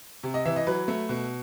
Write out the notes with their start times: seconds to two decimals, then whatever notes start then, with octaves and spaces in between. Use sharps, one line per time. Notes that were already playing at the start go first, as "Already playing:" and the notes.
0.23 C3
0.34 D#5
0.45 E3 E5
0.56 D#5
0.67 F#3 B4
0.88 A3
1.09 B2